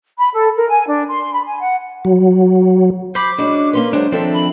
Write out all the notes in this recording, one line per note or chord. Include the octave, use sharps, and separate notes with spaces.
B5
A4
A#4
G#5
D4
C6
B5
G#5
F#5
F#3
C5 B5 D6
G#3 C#4 D4 F#4
A#3 C#4 B4 C6
F#3 G#3 D4 G#4 C5
D#3 F3 C4 D4 A4 E5
B5